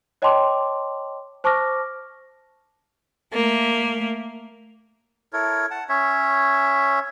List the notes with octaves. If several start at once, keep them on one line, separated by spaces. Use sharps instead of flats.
C#5 D#5 G5 A5 C6 D6
C5 A5 C#6 D6 F6 A#6
A3 A#3
E4 A4 A#4 C#5
F#5 A5
C#4 C#5 E5